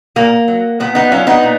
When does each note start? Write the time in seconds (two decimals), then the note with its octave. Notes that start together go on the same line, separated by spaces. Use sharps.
0.16 A#2 A#3
0.48 F#3
0.80 A#2 B3
0.95 B3 D#4
1.12 F#3 C#4 F4
1.27 B3 D#4
1.43 A#2